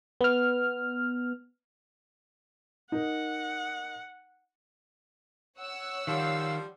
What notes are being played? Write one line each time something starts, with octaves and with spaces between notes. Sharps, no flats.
B3 F6
D#4 A#4 F#5
C#5 F#5 E6
D#3 F3 G3 F5